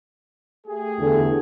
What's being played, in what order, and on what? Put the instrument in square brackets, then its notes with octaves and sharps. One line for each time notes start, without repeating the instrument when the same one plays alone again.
[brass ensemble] A3 G4 G#4
[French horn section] E2 D3 A4